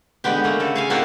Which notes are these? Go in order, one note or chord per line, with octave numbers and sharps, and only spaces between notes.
D3 G#3 B3 G4
A3 A#3
C#3 A4
G#4 F5 G#5
A#3 C4 E4 F#4 A4 D5